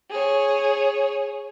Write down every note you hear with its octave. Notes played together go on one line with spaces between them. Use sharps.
G#4 C#5